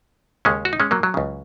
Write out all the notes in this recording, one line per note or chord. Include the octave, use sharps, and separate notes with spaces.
D#2 C#3 G#3 C#4
F#4
D#4
G#3 C#4
F#3 A#3
F#3
C#2 C#3